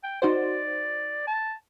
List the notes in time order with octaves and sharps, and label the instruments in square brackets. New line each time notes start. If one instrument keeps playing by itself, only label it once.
[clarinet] G5
[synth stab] D#4 F#4 C5 [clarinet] D5
[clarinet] A5